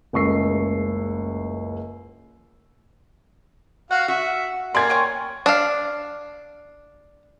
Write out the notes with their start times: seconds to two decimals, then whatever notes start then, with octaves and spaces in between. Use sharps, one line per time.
0.13 F#1 C#2 A3 C#6 E6 C7
3.91 F#4 F5 F#5
4.08 F#4 E5
4.75 A#3 D5 G#5 C6 G#6
4.90 C#5 G5 G#5
5.46 D4 F5